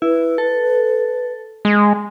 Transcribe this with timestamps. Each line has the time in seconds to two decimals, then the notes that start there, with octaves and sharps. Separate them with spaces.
0.02 E4 B4
0.38 A4
1.65 G#3